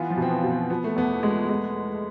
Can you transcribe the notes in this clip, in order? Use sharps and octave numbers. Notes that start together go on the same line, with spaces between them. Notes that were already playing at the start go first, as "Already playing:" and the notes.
Already playing: E3 B3 F4
F3
B2
C4
B3
B2
C4
F3 B3
A3
E2 B3
G#3
G#3